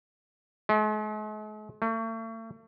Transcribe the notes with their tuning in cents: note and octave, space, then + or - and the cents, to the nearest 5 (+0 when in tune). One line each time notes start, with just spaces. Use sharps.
G#3 +45
A3 +40